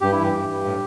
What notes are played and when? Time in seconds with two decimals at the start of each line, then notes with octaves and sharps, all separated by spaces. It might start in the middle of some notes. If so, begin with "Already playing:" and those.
0.01 G2 G4
0.12 E3 E4
0.22 G4
0.33 G2
0.48 G2
0.65 A2